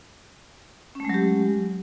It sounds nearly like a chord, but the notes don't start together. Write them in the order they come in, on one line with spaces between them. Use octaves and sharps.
C#4 A3 G#3 F#3 G4